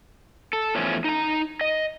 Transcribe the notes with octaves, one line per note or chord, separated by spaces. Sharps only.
A4
E2 F3 A3 C#4
D#4 A#5
D#5